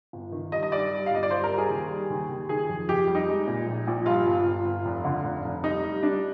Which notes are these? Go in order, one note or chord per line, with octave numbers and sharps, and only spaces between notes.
G1
D#3
G2 D#5
D#5
G2 D5
G3
F5
G1 D#5
D5
G3 C5
A#4
G3
G#4
D#2
G3
D#2
D#2
D#3 G#4
F2
F2 G4
G3
D#4
G#3
A#2
A#1
A#1
G2 F4
G1
G1
G1
F1
D3
F1
F1
G3 D#4
G3
G3 D4